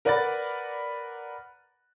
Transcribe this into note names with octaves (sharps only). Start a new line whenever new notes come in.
A#4 B4 D5 F#5 B5 A6